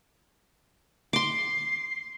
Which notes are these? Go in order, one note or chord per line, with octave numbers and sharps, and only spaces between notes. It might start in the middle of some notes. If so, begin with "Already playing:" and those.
C6 D6 C7